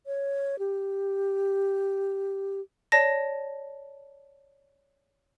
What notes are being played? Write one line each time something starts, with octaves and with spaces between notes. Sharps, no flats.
C#5
G4
C#5 D5 A5 A#6